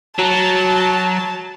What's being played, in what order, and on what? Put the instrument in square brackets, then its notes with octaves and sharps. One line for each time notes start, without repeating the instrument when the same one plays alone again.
[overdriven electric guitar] F#3 [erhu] A5